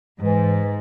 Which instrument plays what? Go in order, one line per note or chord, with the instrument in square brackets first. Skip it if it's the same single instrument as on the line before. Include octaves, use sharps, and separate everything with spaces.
[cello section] G#2 [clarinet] E3